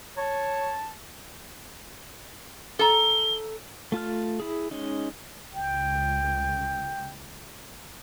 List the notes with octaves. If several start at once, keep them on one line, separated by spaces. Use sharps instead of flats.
C#5 A5
A4 A#5 G7
A3 F4 A5 F6
E4 G#4
G#3 C#4 D#4
C#2 G5